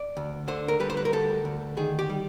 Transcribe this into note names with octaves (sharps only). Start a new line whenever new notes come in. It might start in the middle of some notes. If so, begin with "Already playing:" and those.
Already playing: D5
D2
D3 C5
A#4
G3 B4
C5
B4
A#4
D2 A4
D2
D#3 G#4
G4
G3